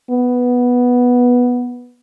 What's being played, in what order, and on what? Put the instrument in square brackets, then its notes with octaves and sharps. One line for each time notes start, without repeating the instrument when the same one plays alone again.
[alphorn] B3